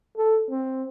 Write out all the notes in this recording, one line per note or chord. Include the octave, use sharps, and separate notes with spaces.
A4
C4